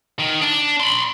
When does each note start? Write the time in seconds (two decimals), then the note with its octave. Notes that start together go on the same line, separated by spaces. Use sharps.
0.19 D#3
0.42 D4
0.80 B5 C6